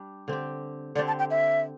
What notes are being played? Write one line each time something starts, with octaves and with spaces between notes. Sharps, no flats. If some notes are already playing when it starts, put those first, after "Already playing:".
Already playing: G3 D4 G4
D3 C4 G4
D3 C4 G4 D5
A5
G5
E5